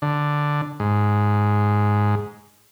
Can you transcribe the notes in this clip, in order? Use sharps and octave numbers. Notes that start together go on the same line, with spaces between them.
D3
G#2